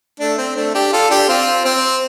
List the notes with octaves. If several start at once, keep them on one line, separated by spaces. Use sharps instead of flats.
A3 D4
C4
A3 D4
D4 G4
F4 A4
D4 G4
C4 F4
C4